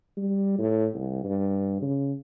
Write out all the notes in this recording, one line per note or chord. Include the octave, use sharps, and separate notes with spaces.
G3
A2
C2
G2
C#3